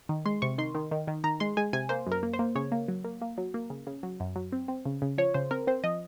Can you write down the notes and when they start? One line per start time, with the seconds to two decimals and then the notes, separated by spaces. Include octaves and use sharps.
0.09 D#3
0.26 G#3 C6
0.42 C3 C#6
0.58 D#3 C6
0.75 D#3
0.91 D#3
1.08 D#3
1.24 D#3 A#5
1.40 G#3 C6
1.57 G#3 G#5
1.73 C3 G#5
1.89 A#3 C5
2.07 F#2 A#4
2.23 A#3
2.33 C5
2.39 A#3
2.55 C#3 C#5
2.72 A#3
2.88 F#3
3.04 A#3
3.22 A#3
3.38 F#3
3.54 A#3
3.70 C#3
3.87 C#3
4.03 F#3
4.20 F#2
4.36 F#3
4.52 C4
4.68 C4
4.86 C#3
5.02 C#3
5.18 F3 C#5
5.34 C#3 C5
5.51 C4 A#4
5.67 C4 C5
5.84 F3 D#5